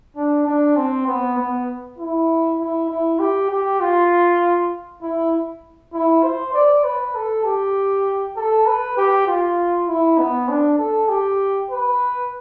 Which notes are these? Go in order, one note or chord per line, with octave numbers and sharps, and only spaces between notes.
D4
D4
C4
B3
B3
E4
E4
E4
G4
G4
F4
E4
E4
C5
D5
B4
A4
G4
A4
B4
G4
F4
E4
B3
D4
A4
G4
B4